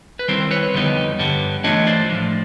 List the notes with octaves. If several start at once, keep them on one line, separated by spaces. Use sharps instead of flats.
B4
D#3 G3 C4 E4 A#4 C5
B4 C#5
F2 D3 G3 B3 D#4
G2 D3 G3 B3
E3 A3 D4 F4 C#5 D#5
C5 D5
A2 F3 G#3